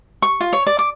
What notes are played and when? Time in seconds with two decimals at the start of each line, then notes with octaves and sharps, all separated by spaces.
0.22 C#6
0.40 F4
0.53 C#5
0.67 D5
0.79 D6